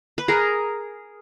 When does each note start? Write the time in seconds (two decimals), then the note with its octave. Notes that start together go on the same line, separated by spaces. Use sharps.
0.18 B4
0.28 G#4 A#4